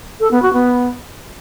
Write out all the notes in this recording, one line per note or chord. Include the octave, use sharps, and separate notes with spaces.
A4
B3
F#4
B3